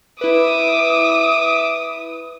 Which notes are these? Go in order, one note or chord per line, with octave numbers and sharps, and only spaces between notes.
E4 B4 E5 D6 D#6